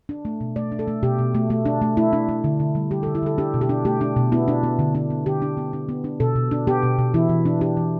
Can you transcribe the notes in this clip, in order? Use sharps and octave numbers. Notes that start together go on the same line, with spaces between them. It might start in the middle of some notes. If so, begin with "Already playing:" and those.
D4
A3
B2
A3 D5
D4
A4
A3
B2 G4
B2
A3
A3
D4
A3
A3 E4
D4
A3
D3
D3
G3
G3 G4
A4
D3
E4
D3 A4
D4 G4
B2
G4
D4
A3 G4
D4
B2
B3 E4
D4
B3
D3
D4
B3
D3 G4
D4
B3
D4
B3
D4
B2 A4
B2
D4
B3 G4
B2
B2
E3 E4
E3
D4
D4 G4
E3